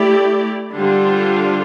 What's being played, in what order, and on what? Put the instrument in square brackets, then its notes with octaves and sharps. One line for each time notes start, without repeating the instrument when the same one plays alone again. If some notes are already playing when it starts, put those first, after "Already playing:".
Already playing: [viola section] A3 E4 G4 D5
D3 G3 D4 F4 C5